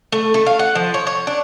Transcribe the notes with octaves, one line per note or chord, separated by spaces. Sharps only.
A3
A3
F5
F#5
F3
C#5
C#5
D4